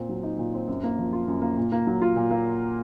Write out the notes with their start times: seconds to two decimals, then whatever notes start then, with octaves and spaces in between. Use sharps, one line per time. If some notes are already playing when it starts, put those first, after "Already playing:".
Already playing: A#2 C4
0.09 F#3
0.23 D#4
0.38 A#2
0.54 C4
0.68 F#2
0.83 A#3
0.99 F3
1.13 F4
1.27 F#2
1.42 A#3
1.57 A#2
1.72 A#3
1.87 F#3
2.02 F4
2.16 A#2
2.31 A#3